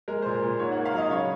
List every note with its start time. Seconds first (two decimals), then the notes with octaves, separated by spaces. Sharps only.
0.08 G#3 A#4
0.22 A#2 C5
0.35 A#4
0.42 A#2
0.59 G#2 C#5
0.72 A#3 F#5
0.85 F5
0.94 F#3 D#5
1.10 C#3 C#5